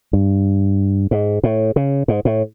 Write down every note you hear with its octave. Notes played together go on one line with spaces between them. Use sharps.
G2
G#2
A2
C#3
G#2
A2